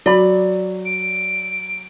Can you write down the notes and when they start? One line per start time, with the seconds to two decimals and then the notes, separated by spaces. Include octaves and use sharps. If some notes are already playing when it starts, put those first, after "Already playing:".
0.06 F#3 D5 B5
0.86 D7